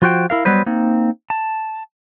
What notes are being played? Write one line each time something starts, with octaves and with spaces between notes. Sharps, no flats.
F3 F4 F#4 C5 G5
E4 A#4 F5
F#3 G3 B3 B4 C5
A#3 C4 D#4
A5